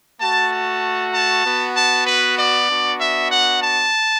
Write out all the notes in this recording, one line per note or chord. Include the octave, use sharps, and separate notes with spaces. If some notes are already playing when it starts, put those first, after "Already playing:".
A3 F#4 A5
A5
A5
B3 F#4
A5
B4
D5
B3 D4 F#4
E5
F#5
A5